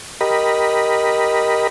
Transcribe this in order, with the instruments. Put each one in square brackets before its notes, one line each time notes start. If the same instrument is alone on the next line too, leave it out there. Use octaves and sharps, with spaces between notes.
[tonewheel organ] G4 A#4 D#5 B5